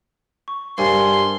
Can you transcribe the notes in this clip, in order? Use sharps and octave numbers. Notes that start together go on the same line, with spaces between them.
C#6
G2 A#4 C5 G#5 C6